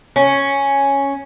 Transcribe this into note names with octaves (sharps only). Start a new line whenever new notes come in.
C#4